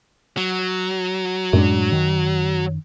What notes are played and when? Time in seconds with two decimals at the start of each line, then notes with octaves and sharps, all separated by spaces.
0.37 F#3
1.53 F#2 A2 G#3 D4
1.92 D#3